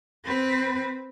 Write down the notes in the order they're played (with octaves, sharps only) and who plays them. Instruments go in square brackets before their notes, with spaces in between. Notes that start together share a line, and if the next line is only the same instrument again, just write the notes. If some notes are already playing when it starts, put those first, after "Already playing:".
[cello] C4 B4